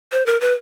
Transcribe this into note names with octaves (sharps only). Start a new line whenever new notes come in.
C5
A#4
B4